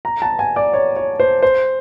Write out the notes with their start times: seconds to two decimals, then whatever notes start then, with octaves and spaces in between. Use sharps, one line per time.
0.05 A#5
0.22 A5
0.39 G#5
0.56 D5
0.73 C#5
0.96 C#5
1.20 C5
1.42 C5